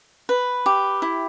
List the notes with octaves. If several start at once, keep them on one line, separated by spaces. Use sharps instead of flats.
B4
G4
E4